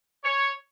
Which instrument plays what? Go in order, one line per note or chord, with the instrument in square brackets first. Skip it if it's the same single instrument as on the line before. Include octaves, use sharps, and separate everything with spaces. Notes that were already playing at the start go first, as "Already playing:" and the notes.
[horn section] C#5